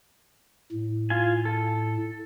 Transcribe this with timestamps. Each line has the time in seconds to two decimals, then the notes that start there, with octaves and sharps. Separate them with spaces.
0.72 A2
1.10 F4 G#5
1.45 A4